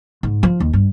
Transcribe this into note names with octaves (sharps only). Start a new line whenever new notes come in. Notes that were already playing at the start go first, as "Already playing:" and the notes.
G#2
F3
D#2
G2